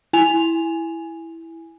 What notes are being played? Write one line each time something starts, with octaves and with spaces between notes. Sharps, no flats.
E4 G#5 F7